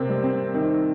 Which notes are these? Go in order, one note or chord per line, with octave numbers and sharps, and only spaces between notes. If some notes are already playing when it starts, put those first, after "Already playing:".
Already playing: C3 A#3 C4
G3
C4
D#3 C4